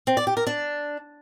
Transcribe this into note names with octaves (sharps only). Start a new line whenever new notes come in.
C4
D5
G4
A#4
D4